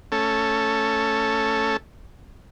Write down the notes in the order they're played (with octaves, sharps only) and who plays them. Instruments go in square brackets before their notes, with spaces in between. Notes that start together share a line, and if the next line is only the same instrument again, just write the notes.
[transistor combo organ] A3 C#4 A4